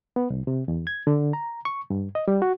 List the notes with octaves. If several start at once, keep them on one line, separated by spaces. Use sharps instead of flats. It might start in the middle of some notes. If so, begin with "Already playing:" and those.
B3
C2
C3
E2
G#6
D3
A#5
C#6
G2
D#5
G3
F#4